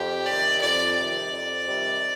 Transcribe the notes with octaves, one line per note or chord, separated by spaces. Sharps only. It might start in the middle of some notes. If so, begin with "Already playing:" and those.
Already playing: F2 G4
C3 D#3 G3 D5
F2 D5
C3 D#3 G3 D5
F2
C3 D#3 G3